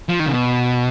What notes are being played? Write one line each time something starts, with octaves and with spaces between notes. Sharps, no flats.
F3
D#3
C#3
B2